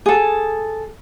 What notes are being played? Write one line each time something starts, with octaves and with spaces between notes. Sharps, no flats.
G#4 A4